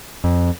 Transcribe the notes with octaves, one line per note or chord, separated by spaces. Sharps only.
F2